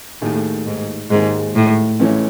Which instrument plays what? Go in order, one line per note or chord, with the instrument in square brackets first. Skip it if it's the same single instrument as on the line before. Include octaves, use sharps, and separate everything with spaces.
[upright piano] D#2 D#3 A3 D#4 G#4 [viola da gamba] A2
[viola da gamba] G#2
[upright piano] D#2 D#3 G#3 [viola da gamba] G#2
[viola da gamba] A2
[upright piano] C#2 C#3 E3 A3 C#4